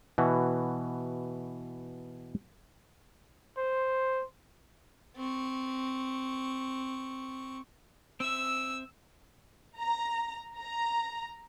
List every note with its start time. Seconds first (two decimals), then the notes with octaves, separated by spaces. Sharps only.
0.18 B2 E3 F#4
3.57 C5
5.16 C4 C#6
8.20 C4 E5 E6
9.78 A#5
10.58 A#5